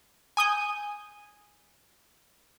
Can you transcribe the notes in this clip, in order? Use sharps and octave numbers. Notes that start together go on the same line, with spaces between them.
G#5 D#6 G6